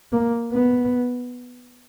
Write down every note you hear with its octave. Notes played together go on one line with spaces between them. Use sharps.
A#3
B3